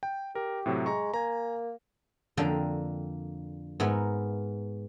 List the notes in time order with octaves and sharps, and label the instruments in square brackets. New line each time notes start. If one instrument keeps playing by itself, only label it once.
[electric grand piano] G5
[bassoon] G4 [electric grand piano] A#4
[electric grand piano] A2 C3 F#3
[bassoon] G#3 [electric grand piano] A#5 C#6
[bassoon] A#3 [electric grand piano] G#5 A#5
[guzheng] F2 D3 A#3 D#5 G5
G#2 B3 A#4 E5